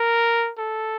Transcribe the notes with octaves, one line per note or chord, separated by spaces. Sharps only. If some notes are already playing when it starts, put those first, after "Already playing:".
Already playing: A#4
A4